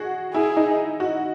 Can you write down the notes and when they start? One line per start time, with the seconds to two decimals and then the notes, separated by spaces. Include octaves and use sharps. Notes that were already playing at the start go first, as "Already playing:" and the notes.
Already playing: F#4 G#4
0.34 E4 G#4
0.57 D#4
1.00 F#4